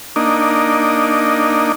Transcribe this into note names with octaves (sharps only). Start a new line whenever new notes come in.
A#3 D4 D#4